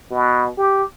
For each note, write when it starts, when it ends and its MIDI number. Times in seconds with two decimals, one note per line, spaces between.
0.11 0.48 47
0.58 0.83 67